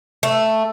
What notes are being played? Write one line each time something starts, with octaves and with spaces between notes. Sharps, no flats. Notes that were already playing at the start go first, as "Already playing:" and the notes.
A3